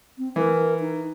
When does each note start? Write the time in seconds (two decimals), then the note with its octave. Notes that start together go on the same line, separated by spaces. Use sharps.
0.18 C4
0.36 E3 A#4
0.80 D#4